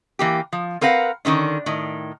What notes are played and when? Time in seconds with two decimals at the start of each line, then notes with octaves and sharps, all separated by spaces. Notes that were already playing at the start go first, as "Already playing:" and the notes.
0.19 E3 A#3 G4
0.53 F3
0.81 C4 A#4 B4 F5 F#5
1.25 D3 D#3 C#4 D4
1.66 A2 D#3